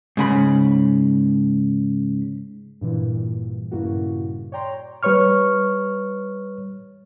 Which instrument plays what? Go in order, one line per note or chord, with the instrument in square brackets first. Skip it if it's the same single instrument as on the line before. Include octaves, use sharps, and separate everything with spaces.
[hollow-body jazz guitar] G#2 C#3 B5
[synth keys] G2 A#2 E3
G2 A#2 C#3 A#3 E4 F#4
C#5 D5 G5 A#5 C6
[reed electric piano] G3 B4 C#5 C#6 F6